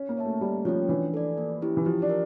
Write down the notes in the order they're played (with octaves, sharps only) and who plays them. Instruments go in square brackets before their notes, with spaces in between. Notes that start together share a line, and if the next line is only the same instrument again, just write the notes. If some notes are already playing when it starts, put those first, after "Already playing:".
Already playing: [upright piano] C#4
A#3
[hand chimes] C#5 E5 A5
[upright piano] A3
[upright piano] G3 [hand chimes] A3
[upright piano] F3 [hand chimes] C#4 F4 C#5
[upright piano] E3 [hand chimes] D4
[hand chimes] A4 D5
A#3
C#4 E4 G4
[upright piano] E3
[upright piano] F3 [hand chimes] G4
[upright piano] D4
[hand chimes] A#4